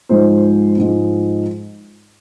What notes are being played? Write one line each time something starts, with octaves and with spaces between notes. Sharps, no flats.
G#2 F3 G#3 C5
G#2 F3 G#3